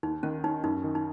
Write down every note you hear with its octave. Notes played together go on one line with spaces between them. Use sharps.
D#2 D#4
D#3 C#4
C#4 D#4
F#2 D#4
D#3
D#4